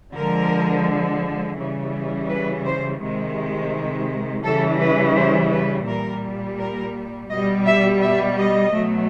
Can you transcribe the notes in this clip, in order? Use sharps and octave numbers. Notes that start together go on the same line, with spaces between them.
D3 F3 G#3 A#4
C#3 E3 G3
B4
C5
C3 D#3 G#3
C#3 E3 G3 A4
B4
C5
B4
A#2 G3 A#4
A#4
B2 G3 D#5
E5
E5
D#5
B2 F#3 A3